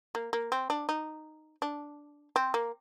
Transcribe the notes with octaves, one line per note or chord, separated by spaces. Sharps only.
A#3
A#3
C4
D4
D#4
D4
C4
A#3